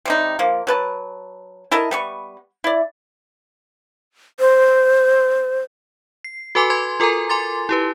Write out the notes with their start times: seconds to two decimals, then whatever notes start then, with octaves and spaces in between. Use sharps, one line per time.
0.05 C3 G3 D#4
0.39 F3 A#3
0.67 F#3 B4 A5
1.71 E4 A4 A#4 D#5
1.91 G3 B3 C#6
2.64 E4 D5
4.40 C5
6.24 C7
6.55 F#4 A4 B4 G#5 C6 D6
6.70 B4 G#5 C6 G#6
7.00 F4 A4 A#4 G#5 A#5
7.29 G#5 C6 D6 A6
7.69 E4 G4 B4